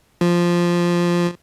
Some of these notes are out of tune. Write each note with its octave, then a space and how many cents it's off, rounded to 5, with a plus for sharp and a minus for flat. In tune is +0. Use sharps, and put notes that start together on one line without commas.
F3 -5